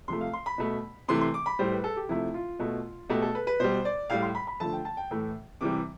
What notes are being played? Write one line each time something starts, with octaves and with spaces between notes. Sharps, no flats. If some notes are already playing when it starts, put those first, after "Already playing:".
C3 F3 A3 C6
F5
C6
B5
B2 A3
C3 E3 A3 C6
C6
D6
B5
A2 G3 C5
B4
A4
G4
C3 F3 A3 E4
F4
B2 A3
B2 A3 G4
A4
B4
B4
B2 G3 C5
D5
A2 G3 F5
C6
B5
B5
D3 F3 A3 A5
G5
A5
G5
A2 E3 A3
C3 E3 G3 D6